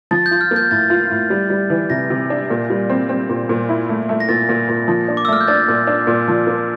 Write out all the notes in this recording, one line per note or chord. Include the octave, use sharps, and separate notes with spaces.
F3 A6
G6
F4
F6
A#3
G6
A2 A6
F4
A2
G3
G3
E3
C3 A#6
C3
D4
A#2
G3
C4
C4
A#2
A#2
E4
A3
A3
A#6
A#2 A6
A#2
A#2
F3
D4
D6
E6
A3 F6
G6
D4 A6
A#2
D4
A#2
F3
A#3